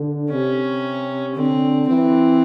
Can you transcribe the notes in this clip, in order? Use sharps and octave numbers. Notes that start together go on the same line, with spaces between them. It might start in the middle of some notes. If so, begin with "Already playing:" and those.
Already playing: D3
C3 C#4
D3 C4
E3 C4